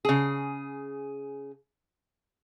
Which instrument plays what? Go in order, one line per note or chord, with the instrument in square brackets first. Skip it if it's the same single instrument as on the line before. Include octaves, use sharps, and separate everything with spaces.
[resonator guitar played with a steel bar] C#3 G#4